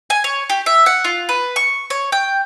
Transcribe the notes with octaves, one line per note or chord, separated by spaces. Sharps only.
G#5
C#5
G4
E5
F#5
F4
B4
C#6
C#5
G5